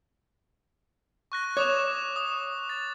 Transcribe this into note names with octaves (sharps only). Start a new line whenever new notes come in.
C#6 F#6 A#6
C#5 D6 D#6 E7
D#6
A6